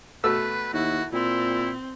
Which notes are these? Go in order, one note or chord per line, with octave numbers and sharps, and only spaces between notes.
B2 A3 B4 E6
D#2 E4 F#4
A#2 C4 E4